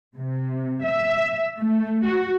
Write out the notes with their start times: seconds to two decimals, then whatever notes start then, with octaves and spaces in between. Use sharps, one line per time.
0.17 C3
0.85 E5
1.59 A3
2.06 F#4